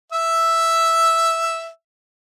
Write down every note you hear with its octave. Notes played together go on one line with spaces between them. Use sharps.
E5 E6